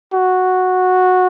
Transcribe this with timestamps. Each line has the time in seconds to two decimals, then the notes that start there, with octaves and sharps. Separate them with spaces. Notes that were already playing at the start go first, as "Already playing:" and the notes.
0.13 F#4